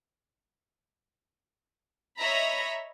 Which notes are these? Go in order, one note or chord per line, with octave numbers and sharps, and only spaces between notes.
C#5 D#5 E5 A#5 B5